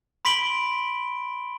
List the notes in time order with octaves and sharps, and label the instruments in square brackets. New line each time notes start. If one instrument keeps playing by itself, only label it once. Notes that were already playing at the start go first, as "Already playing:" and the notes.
[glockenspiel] B5 C6 B6 D7 F#7 G7